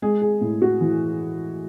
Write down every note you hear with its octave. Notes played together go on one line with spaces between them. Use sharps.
G#3 G#4
G#4
A2
F#4
E3